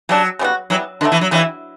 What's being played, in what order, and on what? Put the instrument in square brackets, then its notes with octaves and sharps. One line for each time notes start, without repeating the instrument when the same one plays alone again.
[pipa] C#3 G3 D4 [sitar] F#3
[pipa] C#3 G3 B3 F#4
[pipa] E3 G3 B3 [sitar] F#3
[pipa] B2 F#3 A3 [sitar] D3
[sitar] E3
F#3
[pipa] C#3 G3 C#4 E4 [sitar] E3